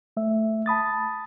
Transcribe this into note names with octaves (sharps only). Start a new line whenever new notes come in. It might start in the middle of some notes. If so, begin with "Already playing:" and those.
A3 E5
A5 B5 D#6 A6